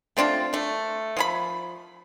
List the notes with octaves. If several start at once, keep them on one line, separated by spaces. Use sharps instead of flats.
A3 C4 D4 F4
A3 D4
F3 G#4 B5